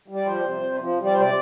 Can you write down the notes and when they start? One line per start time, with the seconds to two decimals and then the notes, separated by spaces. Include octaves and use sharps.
0.08 G3
0.15 D5
0.26 F3 C5
0.44 C3
0.62 C3
0.80 F3
0.98 G3
1.06 D5
1.13 C5
1.17 C3 D5